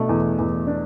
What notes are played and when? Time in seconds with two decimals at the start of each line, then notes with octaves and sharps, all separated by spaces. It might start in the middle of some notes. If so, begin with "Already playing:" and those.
Already playing: B2 A3 D4
0.09 E2
0.39 E2
0.67 D4